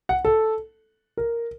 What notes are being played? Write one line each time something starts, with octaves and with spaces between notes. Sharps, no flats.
F#5
A4
A#4